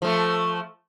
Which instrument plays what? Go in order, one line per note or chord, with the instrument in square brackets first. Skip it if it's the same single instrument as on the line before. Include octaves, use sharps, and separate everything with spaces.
[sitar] F3 A3